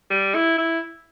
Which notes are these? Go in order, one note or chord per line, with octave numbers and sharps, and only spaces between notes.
G3
E4
E4